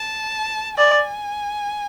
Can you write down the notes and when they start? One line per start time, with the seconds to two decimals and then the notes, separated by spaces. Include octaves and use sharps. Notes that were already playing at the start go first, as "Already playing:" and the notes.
Already playing: A5
0.78 D5 G#5